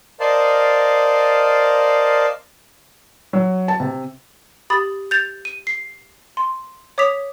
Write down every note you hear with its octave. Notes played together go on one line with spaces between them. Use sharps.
A#4 C5 D5 D#5 F5 A5
F#3
A5
C3
G4 B5 D#6 A6
G6 A6 F7
D#7
C7
C6
C#5 D6 D#6 B6 F7